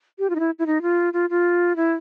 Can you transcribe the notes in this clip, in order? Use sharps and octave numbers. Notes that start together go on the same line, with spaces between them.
G4
F4
D#4
E4
E4
D#4
F4
F4
F4
E4